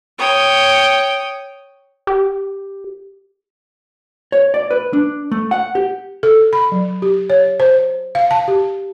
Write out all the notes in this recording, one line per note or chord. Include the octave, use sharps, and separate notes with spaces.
C#5 G5 D#6
G4
C#5
D5
B4
D4
A3
F#5
G4
A4
B5
F#3
G4
C#5
C5
F5
A5
G4